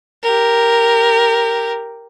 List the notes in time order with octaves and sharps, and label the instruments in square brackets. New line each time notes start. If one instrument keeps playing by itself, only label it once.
[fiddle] G4 A#4